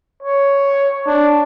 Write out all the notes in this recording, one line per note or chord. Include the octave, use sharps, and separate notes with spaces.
C#5
D4